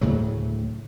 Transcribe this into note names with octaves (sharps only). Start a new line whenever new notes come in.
D2 A2 C#3 F#3